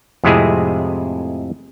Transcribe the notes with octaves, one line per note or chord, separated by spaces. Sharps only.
F2 A2 C3 G#3 E4 G#4